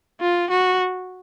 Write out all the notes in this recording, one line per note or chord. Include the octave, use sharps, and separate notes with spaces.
F4
F#4